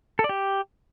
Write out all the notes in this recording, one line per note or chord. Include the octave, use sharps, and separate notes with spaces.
A4
D5
G4